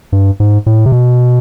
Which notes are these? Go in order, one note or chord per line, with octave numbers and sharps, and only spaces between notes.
G2
G#2
A2
C3
B2